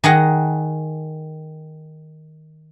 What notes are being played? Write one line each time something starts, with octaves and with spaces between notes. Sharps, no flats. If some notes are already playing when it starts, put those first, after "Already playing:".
D#3 G#4 F#5 A#5